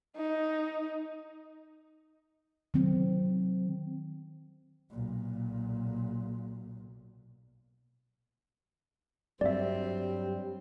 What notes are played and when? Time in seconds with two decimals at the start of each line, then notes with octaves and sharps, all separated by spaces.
0.16 D#4
2.74 D#3 F#3 C4
4.90 B1 A#2
9.41 G2 F#3 G3 C4 D5 E5